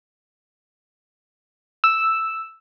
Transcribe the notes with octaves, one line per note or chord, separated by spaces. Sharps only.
E6